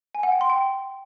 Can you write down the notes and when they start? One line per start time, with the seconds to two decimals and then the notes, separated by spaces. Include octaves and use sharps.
0.15 G#5
0.23 F#5
0.32 G5
0.41 C6
0.50 G5